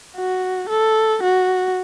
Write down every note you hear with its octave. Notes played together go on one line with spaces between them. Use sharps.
F#4
A4
F#4